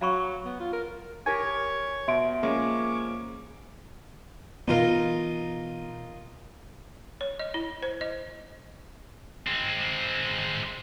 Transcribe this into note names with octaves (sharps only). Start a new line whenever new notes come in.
F#3 F5 B5 C#6
B3
F4
A#4
G4 A#4 C#5 G#5 C#6 G#6
B2 E5 C6 D7
F3 G#3 A#3 C#4 C#6 D6
B2 E3 B3 D#4 F4 A#4
C#5
D#5
E4
C5
D#5
G#3 C4